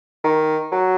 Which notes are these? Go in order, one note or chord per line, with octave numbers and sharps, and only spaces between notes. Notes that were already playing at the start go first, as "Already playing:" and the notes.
D#3
F#3